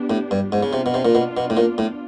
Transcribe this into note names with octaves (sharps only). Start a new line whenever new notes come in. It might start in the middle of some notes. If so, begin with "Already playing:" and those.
Already playing: B3 D4 G4
A2
G2
G#2 B3 D4 F4
C#3
C3
B2
C3
A#2
B2
B2
A2
A#2
A2